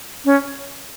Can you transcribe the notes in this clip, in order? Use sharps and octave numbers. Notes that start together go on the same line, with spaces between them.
C#4